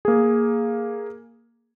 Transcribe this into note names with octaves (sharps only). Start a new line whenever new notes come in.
A#3 G#4